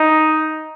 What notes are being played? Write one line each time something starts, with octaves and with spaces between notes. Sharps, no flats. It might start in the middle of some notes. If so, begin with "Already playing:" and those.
Already playing: D#4